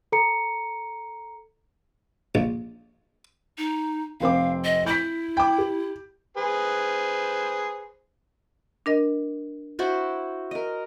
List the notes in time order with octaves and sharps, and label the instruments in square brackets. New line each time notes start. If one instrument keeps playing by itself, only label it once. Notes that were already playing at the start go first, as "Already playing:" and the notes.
[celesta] A4 A#5 C#7
[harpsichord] A#1
[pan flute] D#4
[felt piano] F1 C4 D6 [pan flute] F5
[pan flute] D#5
[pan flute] E4 [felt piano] G6 B6
[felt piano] G5 D6
G4
[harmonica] G#4 B4 C5
[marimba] D4 A#4 D#5
[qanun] E4 F#4 C5
A#4 D#5